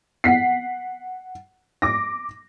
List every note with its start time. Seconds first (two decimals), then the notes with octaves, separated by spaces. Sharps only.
0.24 F#5 B6 C7
1.82 D6 A#6